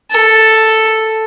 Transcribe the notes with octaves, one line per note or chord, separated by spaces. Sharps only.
A4